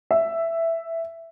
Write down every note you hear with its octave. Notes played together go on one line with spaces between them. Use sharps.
E5